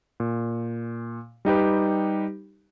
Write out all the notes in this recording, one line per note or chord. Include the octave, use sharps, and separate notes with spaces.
A#2
G3 D#4 G4 B4